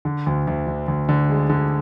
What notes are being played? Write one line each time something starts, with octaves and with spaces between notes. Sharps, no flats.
D3
D2
D2
D3
D2
D3
G#3
D3